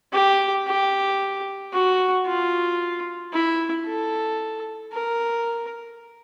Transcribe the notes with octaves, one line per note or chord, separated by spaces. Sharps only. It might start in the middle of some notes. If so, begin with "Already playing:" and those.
G4
G4
F#4
F4
E4
A4
A#4